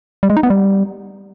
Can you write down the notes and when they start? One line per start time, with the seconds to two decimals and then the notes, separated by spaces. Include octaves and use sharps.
0.23 G3
0.30 G#3
0.37 D#4
0.43 B3
0.50 G3